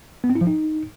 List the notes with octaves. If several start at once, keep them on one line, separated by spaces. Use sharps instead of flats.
B3
C4
E4
F3
D#4